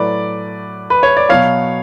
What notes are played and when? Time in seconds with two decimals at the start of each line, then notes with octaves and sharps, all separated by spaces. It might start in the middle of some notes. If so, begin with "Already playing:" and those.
Already playing: A2 F#3 A3 B4 D5
0.90 B4
1.03 C#5
1.17 D5
1.29 B2 F#3 B3 C#5 F5